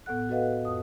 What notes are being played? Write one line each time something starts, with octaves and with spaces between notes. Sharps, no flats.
A2 B3 A4 F#5 F#6
F#4 A4 B4 D#5 F5 F#5
F2 D#6